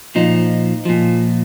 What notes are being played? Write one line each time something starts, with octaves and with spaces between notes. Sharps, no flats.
A#2 F3 D#4
A#2 F3